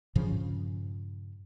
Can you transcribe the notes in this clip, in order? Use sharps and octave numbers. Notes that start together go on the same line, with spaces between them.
G2 A#2 C#3 F3